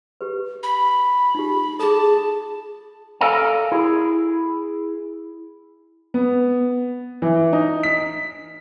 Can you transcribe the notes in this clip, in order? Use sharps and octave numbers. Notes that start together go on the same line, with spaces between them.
G4 B4
B5
D#4 F4 G4
G#4 A4 A5
A4 A#4 D5 F5 G#5 A#5
E4 G#4
B3
E3
D#4
B6